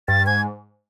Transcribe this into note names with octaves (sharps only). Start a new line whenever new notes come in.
G2 A6
G#2 G#6